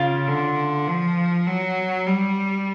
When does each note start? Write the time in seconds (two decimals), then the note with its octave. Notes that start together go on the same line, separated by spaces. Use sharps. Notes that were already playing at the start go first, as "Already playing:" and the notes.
Already playing: C#3 F4
0.28 D3
0.87 F3
1.47 F#3
2.07 G3